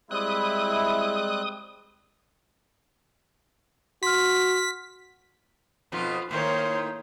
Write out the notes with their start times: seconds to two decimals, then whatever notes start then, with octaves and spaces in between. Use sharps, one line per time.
0.11 G3 G#3 C4 E4 D#6 F#6
4.03 F#4 C6 F6 B6
5.92 F2 B2 D#4 F4
6.31 A2 D#3 A#3 C5 C#5